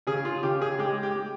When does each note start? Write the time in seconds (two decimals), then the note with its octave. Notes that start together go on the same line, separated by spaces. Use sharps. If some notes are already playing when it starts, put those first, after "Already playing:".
0.07 C#3 G#4
0.25 F4
0.43 C#3 G4
0.62 G#4
0.79 G#3 G4
1.03 G4
1.15 G#3